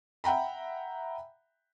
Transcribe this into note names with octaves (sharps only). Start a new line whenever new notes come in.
E5 F#5 G5 A#5 B5